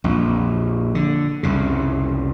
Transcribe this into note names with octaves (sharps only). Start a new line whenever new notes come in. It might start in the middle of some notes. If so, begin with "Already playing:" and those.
A#1 F2
D3
C2 F2 C#3